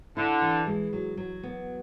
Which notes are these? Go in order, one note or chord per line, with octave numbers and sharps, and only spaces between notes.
D3 E4
E3
G#3
F#3
F#3
B3